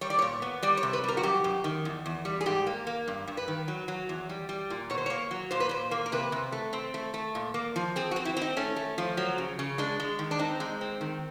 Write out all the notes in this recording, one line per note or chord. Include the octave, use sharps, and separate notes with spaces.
G3 C#5
D5
A#2 C#5
B3
G3 D5
C#5
C3
B4
G3 A#4
F#4
F#2 G4
F#2
D#3
E2
E2
G3
G#4
G#2 G4
A#3
A#3
G2
G2
B4
D#3
F#3
F#3
E2
G3
G3
A#2
B2 C#5
C5
A#3 C#5
F#3
A#2 C5
B4
A#2 C5
A#3
A#4
C3 B4
C3
A3
C4
A3
A3
A#2
A#3
F3
C4 G#4
F#4
C4
E4
C4
D#4
A3 C#4
A3
F3
F#3
C#3
C#3
G#3 D4
G#3
D#3
D4
C4 D#4
G#3
C4
D#3